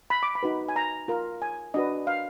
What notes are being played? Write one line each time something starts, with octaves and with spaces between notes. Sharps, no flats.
B5
D6
B5
D#4 F#4 B4
G#5
A#5
F4 A#4
G#5
D4 F#4 B4 D#5
F5